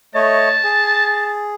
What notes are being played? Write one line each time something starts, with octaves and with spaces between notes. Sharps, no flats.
A3 C#5 D#5 A5
G#4